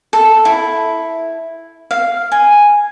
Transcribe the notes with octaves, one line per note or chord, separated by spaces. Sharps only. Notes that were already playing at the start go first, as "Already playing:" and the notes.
A4
E4
F5
G#5